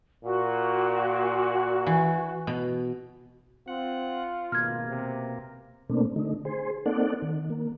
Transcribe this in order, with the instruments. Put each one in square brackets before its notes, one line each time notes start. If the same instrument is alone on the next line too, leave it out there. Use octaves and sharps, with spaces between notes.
[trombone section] A#2 [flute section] F#4
[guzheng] E3
B2
[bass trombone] C4 [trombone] F4 [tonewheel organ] F#5
[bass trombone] G#1 [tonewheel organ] B2 A#3 [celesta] F6 G#6
[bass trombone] C3
[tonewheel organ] B2 A3 A#3 C4 D4
D3 A3 D#4
G#4 C5
A#3 C4 D#4 A4 D5 F#5
D#3
A#3